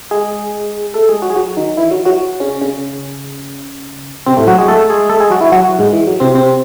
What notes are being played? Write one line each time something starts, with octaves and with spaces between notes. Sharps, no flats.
G#3 G#4
A3 A4
G#3 G#4
F#3 F#4
G#4
F#3 F#4
D#3 D#4
E3 E4
F#3 F#4
F#3 F#4
C#3 C#4
C#3 C#4
C3 C4
A2 A3
F#3 F#4
G#3 G#4
A3 A4
G#3 G#4
A3 A4
G#3 G#4
F#3 F#4
E3 E4
F#3 F#4
G#2 G#3
E3
F#3
C3 C4
C3 C4